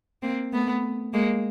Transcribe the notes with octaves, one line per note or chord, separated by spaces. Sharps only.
A#3 C4
A3 B3
G#3 A#3